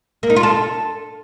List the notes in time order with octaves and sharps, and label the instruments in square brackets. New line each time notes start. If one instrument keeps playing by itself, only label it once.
[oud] A#3
D#4
F4
A4